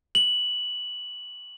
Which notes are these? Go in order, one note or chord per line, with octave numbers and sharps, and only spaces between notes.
F#7